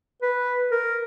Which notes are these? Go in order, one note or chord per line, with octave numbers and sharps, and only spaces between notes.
B4
A#4